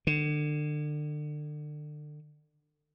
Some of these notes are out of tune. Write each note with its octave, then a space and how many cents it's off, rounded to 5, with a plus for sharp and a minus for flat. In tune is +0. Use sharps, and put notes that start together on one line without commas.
D3 +30